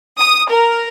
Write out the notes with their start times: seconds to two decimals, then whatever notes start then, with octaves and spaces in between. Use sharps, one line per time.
0.18 D#6
0.49 A#4